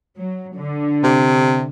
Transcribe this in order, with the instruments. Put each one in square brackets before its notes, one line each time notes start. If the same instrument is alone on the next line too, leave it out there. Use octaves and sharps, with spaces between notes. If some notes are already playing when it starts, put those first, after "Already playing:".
[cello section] F#3
D3
[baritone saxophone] C3